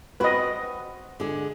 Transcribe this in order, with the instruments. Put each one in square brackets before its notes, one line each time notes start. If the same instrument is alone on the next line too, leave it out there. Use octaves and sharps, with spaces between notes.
[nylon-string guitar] C4 F#4 [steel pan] B4 D#5
[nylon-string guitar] D3 G#3 G#4